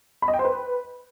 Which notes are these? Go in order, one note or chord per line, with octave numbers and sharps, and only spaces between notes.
B5
D#5
G5
C5
B4